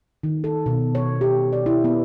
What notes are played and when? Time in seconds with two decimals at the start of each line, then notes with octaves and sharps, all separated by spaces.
0.23 D#3
0.44 A4
0.66 B2
0.95 C#5
1.21 G4
1.53 D5
1.66 E4
1.84 B3